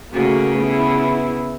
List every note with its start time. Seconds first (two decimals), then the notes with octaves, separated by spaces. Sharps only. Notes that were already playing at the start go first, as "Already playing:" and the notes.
0.13 C#3 A3 A#3 F#4
0.58 B3 E4